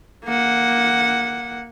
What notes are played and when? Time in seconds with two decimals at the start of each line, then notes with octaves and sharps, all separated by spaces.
0.25 A#3 F#5